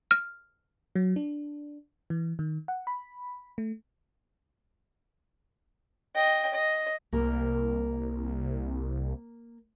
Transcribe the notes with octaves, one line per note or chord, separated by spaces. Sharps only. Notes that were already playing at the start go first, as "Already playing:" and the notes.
F6
F#3
D4
E3
D#3
F#5
B5
A3
D#5 G5
D#5
C2 A#3 A#4